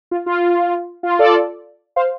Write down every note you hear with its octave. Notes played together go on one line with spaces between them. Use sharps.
F4
F4
F4
A4 D5
C5 F5